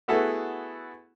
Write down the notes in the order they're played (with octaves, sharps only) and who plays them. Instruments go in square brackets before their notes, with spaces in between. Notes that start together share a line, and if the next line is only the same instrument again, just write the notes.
[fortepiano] A3 B3 E4 F#4 G#4 A4